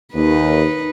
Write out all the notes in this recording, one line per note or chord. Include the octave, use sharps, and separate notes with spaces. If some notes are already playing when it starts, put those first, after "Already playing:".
D#2 D#4 B4